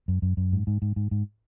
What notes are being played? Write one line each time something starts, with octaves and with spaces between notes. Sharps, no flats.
F#2
F#2
F#2
G#2
G#2
G#2
G#2
G#2